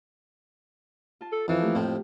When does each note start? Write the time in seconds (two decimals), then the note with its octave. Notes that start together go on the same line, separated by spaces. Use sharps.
1.21 F4 A5
1.32 A4
1.48 F2 E3 F3
1.62 A3 A#3 G4
1.75 F2 A2 C4